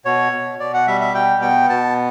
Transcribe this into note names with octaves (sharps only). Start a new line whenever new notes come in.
B2 C#5
B2
B2 D5
F#5
G3 E5
E5
B2 G5
B3 G5
B2 A5